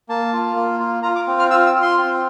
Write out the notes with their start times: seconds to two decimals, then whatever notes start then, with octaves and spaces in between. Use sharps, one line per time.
0.09 A#3 A5
0.33 F4
0.56 A#3
0.80 F4
1.03 F4 A#5
1.16 D6
1.27 C4
1.39 F6
1.51 F4 E6
1.67 E6
1.74 F4
1.82 C6
1.98 C4